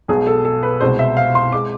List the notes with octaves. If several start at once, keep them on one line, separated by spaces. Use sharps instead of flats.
B1 B2 G#3 G#4
A4
A4
B4
C2 B2 G#3 C5
E5
F5
C6
G#3 D6